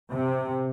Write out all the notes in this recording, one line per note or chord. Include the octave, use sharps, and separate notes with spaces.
C3